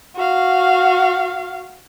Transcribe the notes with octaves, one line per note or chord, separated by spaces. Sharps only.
F#4 F5